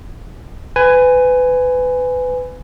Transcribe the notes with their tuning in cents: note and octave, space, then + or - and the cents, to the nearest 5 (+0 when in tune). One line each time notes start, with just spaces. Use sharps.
B4 +25 G#5 -5